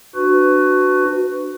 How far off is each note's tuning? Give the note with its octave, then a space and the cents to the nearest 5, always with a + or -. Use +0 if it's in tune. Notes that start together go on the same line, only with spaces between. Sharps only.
D4 +20 F#4 +0 B4 +20